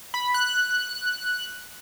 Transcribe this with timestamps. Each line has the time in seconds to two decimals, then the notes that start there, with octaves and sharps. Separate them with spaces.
0.14 B5
0.34 F#6